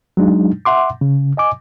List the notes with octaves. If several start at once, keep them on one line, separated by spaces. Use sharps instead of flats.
F#3 G#3 D4 D#4
E5 F#5 C6 D6
C#3
D#5 G#5 D6